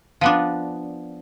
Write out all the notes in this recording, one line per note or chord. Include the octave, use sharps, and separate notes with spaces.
F3 B3 D4